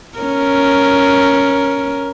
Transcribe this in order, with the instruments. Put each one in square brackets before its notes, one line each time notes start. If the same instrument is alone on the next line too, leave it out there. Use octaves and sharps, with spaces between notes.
[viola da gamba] C#4 A#4